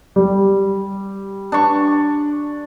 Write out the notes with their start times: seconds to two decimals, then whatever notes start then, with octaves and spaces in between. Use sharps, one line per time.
0.16 G3
1.52 D4 C#6